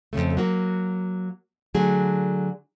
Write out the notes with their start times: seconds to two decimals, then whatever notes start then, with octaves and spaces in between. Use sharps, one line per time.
0.13 F2 A2 C#3 A3
0.37 F#3 A#3 F#4
1.74 D3 F#3 A3 G#4